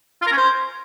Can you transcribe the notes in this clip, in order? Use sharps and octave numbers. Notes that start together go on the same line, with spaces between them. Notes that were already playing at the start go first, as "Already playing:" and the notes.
F4
A#4
C#4
C5